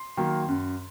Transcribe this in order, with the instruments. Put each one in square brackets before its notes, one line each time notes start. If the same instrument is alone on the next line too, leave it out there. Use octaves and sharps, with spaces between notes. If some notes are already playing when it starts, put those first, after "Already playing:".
Already playing: [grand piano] C6
D#3 F#3 A#3
F#2